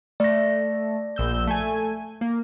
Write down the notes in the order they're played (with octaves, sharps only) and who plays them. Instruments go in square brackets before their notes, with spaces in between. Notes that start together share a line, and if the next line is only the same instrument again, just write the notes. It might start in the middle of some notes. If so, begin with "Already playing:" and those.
[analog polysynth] A3 [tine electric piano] D5 A#6
[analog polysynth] A#1 E6 G6
A3 G#5
A#3